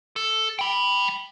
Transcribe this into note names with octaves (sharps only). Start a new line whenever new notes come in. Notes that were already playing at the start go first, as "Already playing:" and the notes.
A4
G5 B5